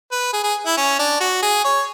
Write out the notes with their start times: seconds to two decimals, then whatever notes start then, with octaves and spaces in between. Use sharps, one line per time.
0.12 B4
0.33 G#4
0.44 G#4
0.66 E4
0.78 C#4
0.99 D4
1.20 F#4
1.43 G#4
1.64 C#5